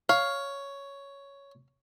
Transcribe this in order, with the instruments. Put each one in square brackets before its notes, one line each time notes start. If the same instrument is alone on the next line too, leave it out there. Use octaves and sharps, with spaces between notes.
[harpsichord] C#5 [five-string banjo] F5